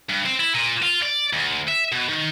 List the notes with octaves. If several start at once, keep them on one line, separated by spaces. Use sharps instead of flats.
G2
C4
E4
A#2
F4
D5
D2
E5
B2
D#3